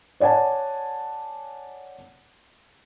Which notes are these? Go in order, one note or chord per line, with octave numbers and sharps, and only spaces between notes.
C#5 D5 F#5 G#5 A5